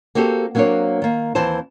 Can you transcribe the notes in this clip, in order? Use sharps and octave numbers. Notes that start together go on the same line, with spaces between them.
A#3 C4 F#4 G4 A4
F#3 A#3 C4 D4 A#4 C#5
D#3 A#3
D#2 E3 C4 C5 A5